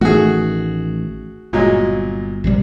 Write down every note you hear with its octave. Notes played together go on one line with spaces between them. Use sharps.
A1 D#3 A3 F#4 G#4
G1 A#2 F#3 G#3
A#1 C3 G3